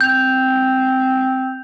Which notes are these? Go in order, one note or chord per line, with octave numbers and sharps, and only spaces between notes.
C4 G6 F7